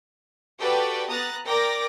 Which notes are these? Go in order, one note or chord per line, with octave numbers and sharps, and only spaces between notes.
F#4 G4 A4 B4 D5 G5
B3 A#5 D#6 F#6 A6
A#4 D5 G5 D6 A#6